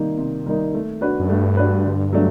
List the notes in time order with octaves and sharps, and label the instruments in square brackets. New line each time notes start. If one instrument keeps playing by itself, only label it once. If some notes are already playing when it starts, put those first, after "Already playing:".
Already playing: [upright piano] C3 D#3 G3 A#3 D#4
C3
D#3 G3 A#3 D#4
A3
D4 F#4 B4
[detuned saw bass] F#2
[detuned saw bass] G2 [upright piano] A3
[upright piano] D4 F#4 B4
D3
F#3 A3 D4